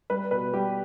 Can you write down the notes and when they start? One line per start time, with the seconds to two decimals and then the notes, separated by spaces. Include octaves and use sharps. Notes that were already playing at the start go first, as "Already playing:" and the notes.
0.10 G3 B4
0.31 B2 B4
0.53 G3 G4